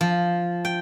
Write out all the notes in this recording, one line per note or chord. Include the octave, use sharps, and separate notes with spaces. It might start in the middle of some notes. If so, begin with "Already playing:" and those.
F3
G5